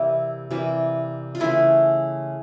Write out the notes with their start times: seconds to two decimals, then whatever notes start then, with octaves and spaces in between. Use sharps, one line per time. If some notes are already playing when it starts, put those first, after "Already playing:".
Already playing: C3 E3 G3 A#3 E4
0.51 C3 E3 G3 A#3
1.35 F4
1.40 C#3 E3 A3 E4